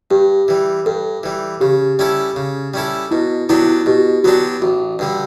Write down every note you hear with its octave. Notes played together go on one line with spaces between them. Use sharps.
G2 G4
E3 G3
G2 A4
E3 G3
C#3 G4
G3 C#4 E4 A4
C#3
G3 C#4 E4 A4
B2 E4
F#3 B3 D4 E4 G4
E4
B2 G4
F#3 B3 D4 F#4 G4
A1 F#4
G2 D3 G3